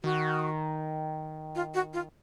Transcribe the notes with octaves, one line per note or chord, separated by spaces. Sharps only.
D#3 F#4
F4
F#4
F4